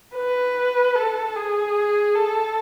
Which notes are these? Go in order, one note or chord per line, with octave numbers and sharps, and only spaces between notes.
B4
A4
G#4
A4